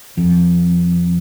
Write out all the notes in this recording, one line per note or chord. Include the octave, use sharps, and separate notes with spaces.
F2